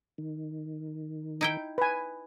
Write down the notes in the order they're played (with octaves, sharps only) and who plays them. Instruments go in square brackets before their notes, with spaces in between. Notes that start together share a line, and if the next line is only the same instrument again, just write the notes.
[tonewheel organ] D#3
[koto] D#4 E4 G5
[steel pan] B4 G#5